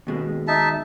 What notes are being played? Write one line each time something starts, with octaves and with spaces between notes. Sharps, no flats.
D#2 B2 G#3
D#4 E5 A5